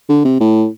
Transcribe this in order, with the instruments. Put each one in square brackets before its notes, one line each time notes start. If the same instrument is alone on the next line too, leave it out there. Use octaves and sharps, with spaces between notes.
[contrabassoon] D3
C3
A2